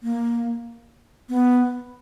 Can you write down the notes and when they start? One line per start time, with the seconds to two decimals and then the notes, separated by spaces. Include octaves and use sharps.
0.02 A#3
1.29 B3